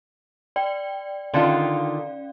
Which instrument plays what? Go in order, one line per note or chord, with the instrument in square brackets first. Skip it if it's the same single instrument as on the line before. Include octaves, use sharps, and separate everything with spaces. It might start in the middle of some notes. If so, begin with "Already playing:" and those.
[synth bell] D5 G5
[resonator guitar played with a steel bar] D3 D#3 F4 [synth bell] C#4 D5 F5